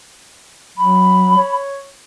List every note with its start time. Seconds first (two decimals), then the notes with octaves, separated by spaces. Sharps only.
0.78 F#3 B5
1.37 C#5